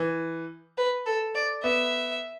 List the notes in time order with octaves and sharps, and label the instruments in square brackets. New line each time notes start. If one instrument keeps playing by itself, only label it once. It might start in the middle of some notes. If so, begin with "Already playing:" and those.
Already playing: [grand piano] E3
[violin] B4
A4
D5
[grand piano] B3 [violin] E5